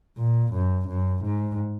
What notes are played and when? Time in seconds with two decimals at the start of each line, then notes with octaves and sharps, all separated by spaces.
0.18 A#2
0.54 F#2
0.88 F#2
1.24 G#2